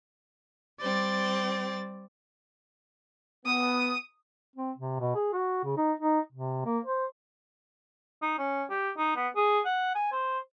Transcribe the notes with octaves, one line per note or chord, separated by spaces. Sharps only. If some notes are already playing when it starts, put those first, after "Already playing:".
G3 C4 D5 A6
B3 D#6
C4
C3
B2
G#4
F#4
C#3
D#4
D#4
C3
A#3
C5
D#4
C#4
G4
D#4
B3
G#4
F#5
G#5
C5